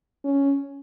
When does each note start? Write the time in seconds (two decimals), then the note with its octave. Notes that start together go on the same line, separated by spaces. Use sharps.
0.25 C#4